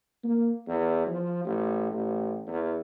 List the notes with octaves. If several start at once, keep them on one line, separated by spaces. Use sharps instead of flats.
A#3
E2
F3
A1
A1
E2